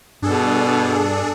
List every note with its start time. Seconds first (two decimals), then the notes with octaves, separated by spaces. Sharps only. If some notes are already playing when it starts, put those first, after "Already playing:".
0.22 G2 B2 D4 G#4 A4